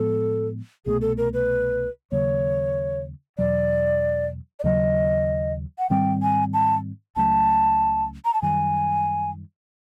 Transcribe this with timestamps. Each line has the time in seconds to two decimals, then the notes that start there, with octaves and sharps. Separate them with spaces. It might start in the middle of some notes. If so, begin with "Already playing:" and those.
Already playing: A2 F3 G#3 B3 A4
0.86 C2 B2 F#3 A3 G#4
1.01 A4
1.17 A#4
1.33 B4
2.12 D#2 C#3 F#3 A#3 C#5
3.38 E2 B2 F#3 D5
4.59 D5
4.64 D#2 C#3 F#3 D#5
5.78 F#5
5.90 G#2 D#3 G3 C4 G5
6.22 G#5
6.53 A5
7.16 C#2 C#3 F#3 A3 A5
8.25 A#5
8.34 A5
8.42 F#2 D#3 G3 G#5